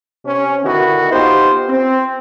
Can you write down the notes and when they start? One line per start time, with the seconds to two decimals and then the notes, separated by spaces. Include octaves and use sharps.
0.25 C3 C4 C#4
0.63 D3 D#3 B3 E4 F#4
1.10 B3 D#4 F4 G4 C5
1.69 C4